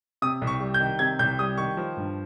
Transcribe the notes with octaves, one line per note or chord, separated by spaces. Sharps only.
C3 D#6
C2
C#6
G3
G6
D#3
C3 G#6
C2 G6
G3 D#6
D#3 C#6
F3
G2